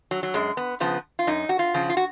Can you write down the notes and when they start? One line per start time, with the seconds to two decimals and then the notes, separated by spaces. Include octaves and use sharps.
0.11 F#3
0.23 F#3
0.34 F#2 G#3
0.57 B3
0.80 C#3 F3 B3
1.19 F4
1.27 F#2 D#4
1.49 F#4
1.59 F4
1.74 C#3 F3
1.89 F4
1.97 F#4